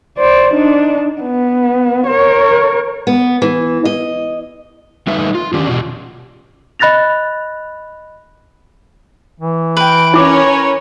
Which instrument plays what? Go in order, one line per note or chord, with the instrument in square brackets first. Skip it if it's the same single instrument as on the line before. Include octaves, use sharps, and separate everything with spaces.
[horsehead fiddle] C5 D5
D4 D#4
B3
A#4 C#5
[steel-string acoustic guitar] B3
E3
D#5
[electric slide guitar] G3 A3 D#4 F4 B4 E5
F4
D#3 C#4 D4 G4
B2 F4 G4
[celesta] D#5 B5 F#6 A6 A#6 F7
[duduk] E3
[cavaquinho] B4 G5 [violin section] D7
[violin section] C#4 A#4 C#5 [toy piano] E4 D6